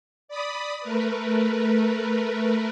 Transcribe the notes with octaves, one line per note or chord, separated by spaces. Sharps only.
D5 B5 D#6
A3 A#4 B4